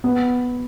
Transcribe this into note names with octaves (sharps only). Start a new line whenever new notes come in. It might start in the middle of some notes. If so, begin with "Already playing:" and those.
B3